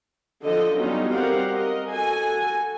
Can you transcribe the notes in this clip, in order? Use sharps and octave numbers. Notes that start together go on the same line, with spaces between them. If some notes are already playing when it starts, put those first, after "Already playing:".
D3 F3 A4 D#5
F#3 G3 B3 C#4 D#4 F4
G3 C4 G4 A#4 F5 F#5
A#4 D#5
F#4 A4 G#5